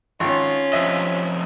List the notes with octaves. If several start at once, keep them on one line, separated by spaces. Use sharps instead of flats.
G#1 C#4 F4
C3 F3 D#5 E5